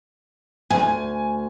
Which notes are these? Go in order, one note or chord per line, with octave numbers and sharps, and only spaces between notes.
D2 G#5